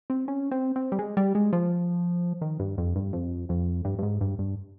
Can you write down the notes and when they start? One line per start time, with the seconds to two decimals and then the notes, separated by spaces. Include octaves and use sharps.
0.10 C4
0.28 C#4
0.51 C4
0.76 C4
0.92 G3
0.99 G#3
1.17 G3
1.35 G#3
1.53 F3
2.41 D#3
2.60 G2
2.78 F2
2.96 G2
3.13 F2
3.49 F2
3.85 G2
3.99 G2
4.03 G#2
4.21 G2
4.39 G2